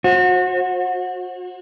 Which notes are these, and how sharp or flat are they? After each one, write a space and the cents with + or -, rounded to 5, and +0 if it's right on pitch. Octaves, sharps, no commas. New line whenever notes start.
F#4 -25 C5 +35